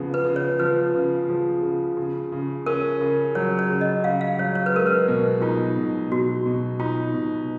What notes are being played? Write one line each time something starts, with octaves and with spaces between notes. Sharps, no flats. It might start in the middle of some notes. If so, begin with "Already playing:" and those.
Already playing: C#3 F3 B3
B4
C#3
C#5
F3 B4
C#3
F3
C#3
C#3
C#3
C#4 A#4
C#3
F#3 C#5
C#5
C#3
D#5
C#3 F5
F5
F#3 C#5
C#5
B4
G#3 A#4
B4
B2
D#4 F4
B2
B2 F#4
B2
D#4 F4
B2